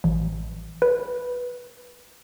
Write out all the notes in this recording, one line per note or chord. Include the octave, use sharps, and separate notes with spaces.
A1
B4